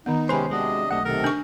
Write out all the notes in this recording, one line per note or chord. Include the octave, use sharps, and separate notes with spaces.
D#3 B3 D#4
C3 D#3 G#3 C#4 B4 C5 B5
C3 G#3 D4 F#4 D#5
B1 A3 D#5 F#5
C3 D#3 A4 A#4
D4 C#6